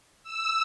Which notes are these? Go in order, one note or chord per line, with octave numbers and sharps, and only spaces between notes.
E6